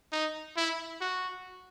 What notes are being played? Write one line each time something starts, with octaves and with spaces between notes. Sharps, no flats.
D#4
E4
F#4